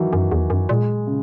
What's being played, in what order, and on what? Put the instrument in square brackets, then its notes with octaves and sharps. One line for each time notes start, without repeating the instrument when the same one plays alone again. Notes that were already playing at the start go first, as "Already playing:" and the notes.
Already playing: [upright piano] D#3 E3 F#3
[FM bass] F#2
E2
F#2
[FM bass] A#2 [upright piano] G#3
[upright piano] C#3